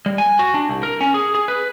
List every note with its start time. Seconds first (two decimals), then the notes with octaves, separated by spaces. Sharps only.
0.06 G3
0.18 G#5
0.39 F#4
0.54 D4
0.69 C2
0.83 A#4
1.01 C#4
1.14 G#4
1.35 G#4
1.48 B4